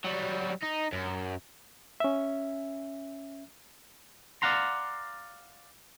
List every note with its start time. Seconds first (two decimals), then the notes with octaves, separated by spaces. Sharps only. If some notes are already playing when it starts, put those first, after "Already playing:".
0.04 F#3 G3
0.63 D#4
0.93 F#2
2.00 C#4 E5
4.42 D5 D#5 F5 F#5 A#5 C6